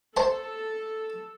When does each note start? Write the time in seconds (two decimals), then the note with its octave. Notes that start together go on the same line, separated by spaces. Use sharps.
0.17 A4 C5 A5